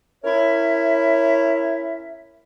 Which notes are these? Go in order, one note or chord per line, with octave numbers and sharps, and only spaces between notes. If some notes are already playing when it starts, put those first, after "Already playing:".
C#4 E4 A#4 C#5 E5